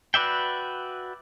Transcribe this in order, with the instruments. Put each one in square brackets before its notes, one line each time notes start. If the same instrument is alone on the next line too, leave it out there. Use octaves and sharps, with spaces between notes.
[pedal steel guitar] F#4 B4 D5 E5 G5